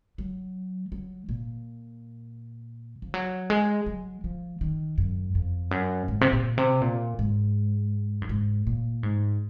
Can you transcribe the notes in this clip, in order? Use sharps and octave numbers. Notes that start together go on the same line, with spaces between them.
F#3
F#3
A#2
F3
F#3
G#3
F#3
F3
D#3
F#2
F2
F#2
G#2
C3
A#2
C3
A#2
G#2
F#2
G#2
A#2
G#2